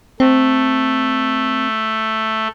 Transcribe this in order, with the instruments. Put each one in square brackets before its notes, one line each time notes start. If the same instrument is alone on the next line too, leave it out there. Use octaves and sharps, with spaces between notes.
[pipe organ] A3 [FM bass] C4